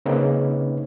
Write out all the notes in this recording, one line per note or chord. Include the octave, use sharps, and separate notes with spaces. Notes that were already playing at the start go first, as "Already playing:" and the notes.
C#3 A#3 C4 C#4 D#4 B4